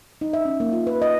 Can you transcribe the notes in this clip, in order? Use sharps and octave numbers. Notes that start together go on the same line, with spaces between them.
D#4
E5
C#4
A#3
F4
B4
D#5